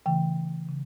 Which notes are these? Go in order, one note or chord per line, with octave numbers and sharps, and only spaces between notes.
C#3 E3 A3 G5
C#3